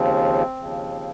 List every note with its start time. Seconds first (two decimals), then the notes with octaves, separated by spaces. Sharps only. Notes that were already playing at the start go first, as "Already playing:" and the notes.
Already playing: D#2 C#3 F3 C4
0.57 D#2 C#3 F3